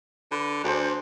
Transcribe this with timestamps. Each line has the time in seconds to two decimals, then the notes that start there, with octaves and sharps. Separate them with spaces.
0.32 D3 B4
0.64 D2 D4 G#4 C5